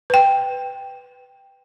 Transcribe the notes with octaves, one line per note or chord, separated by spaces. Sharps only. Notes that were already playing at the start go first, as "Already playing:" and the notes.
B4 G5